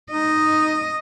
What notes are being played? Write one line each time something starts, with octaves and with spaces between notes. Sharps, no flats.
D#4 D#5